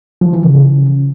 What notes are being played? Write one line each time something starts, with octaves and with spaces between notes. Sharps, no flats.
F3
E3
C#3